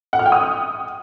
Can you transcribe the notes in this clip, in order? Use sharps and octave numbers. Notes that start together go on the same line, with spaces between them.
F#5
F6
G5
D#6